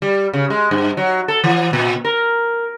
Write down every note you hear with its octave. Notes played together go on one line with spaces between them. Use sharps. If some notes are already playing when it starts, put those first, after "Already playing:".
G3
C#3
G#3
G2
F#3
A4
E3
A#2
A#4